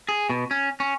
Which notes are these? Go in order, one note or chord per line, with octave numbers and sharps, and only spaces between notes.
G#4
B2
C#4
C#4